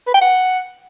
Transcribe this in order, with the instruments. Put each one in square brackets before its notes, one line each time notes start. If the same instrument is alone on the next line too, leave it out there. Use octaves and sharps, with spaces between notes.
[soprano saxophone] B4
G5
F#5